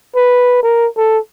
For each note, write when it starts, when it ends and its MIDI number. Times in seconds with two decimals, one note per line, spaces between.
0.15 0.58 71
0.63 0.87 70
0.97 1.18 69